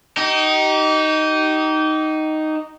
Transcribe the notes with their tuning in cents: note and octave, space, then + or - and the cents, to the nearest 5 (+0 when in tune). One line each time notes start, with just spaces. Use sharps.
D#4 +0 G4 -35